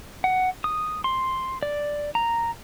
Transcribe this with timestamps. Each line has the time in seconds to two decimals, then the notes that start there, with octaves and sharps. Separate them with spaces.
0.24 F#5
0.64 D#6
1.04 C6
1.63 D5
2.15 A#5